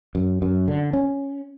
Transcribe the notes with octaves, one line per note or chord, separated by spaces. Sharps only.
F#2
F#2
D3
C#4